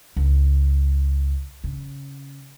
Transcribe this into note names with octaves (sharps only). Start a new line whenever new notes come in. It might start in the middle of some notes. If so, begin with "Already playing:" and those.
C#2
C#3